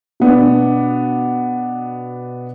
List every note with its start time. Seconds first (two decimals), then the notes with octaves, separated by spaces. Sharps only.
0.20 B2 B3 D4